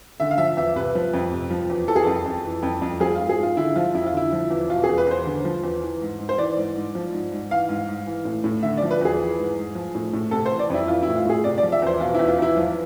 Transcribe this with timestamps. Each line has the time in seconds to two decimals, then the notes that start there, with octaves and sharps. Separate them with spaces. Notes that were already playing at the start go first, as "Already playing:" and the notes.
0.20 D3 E5
0.31 F5
0.38 F3 E5
0.57 E2 E5
0.76 C3 B4
0.95 F3
1.13 F2
1.31 C3
1.50 F3
1.70 E2
1.88 E3 A4
1.96 G#4
2.03 F2 A4
2.26 F2
2.45 E3
2.63 F2
2.82 F2
3.00 F3 G#4
3.15 G#2 F4
3.29 G#4
3.38 G#2
3.43 F4
3.57 D3 E4
3.76 F3 F4
3.94 F2 E4
4.06 F4
4.13 D3 E4
4.32 F3
4.51 E2
4.69 B2 F4
4.84 G#4
4.89 E2
4.98 B4
5.07 E2 C5
5.25 D3
5.45 F3
5.63 E2
5.82 E3
6.01 G#2
6.19 G#2
6.29 C5
6.38 E3 D5
6.57 G#2
6.75 G#2
6.95 F3
7.13 G#2
7.32 G#2
7.51 E3 F5
7.69 G#2
7.89 G#2
8.06 E3
8.25 A2
8.44 A2
8.63 D3 E5
8.77 F3 D5
8.91 B4
9.01 E2 G#4
9.20 E3
9.38 G#2
9.57 G#2
9.75 F3
9.95 A2
10.13 A2
10.31 C3 A4
10.46 C5
10.51 E3
10.59 D5
10.70 F2 E4
10.88 E3 F4
11.03 A2 E4
11.16 F4
11.25 A2 G#4
11.44 C3 D5
11.58 D5
11.63 F3
11.72 E5
11.82 E2 C5
12.00 B2 F4
12.14 E2 E4
12.28 F4
12.38 E2 E4
12.57 F3 F4